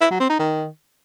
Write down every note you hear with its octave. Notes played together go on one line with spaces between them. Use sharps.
E4
F#3
C4
D#4
D#3